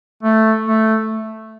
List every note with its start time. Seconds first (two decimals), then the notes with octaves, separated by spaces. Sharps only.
0.23 A3
0.65 A3